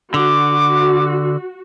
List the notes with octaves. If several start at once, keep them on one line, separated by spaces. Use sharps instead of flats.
D3 F#4 D6